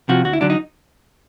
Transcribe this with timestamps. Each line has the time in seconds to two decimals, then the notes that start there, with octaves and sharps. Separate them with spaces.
0.09 C3 F3 F#4
0.25 D2 F#4
0.33 E4
0.41 D3 F#3 D4
0.50 D#4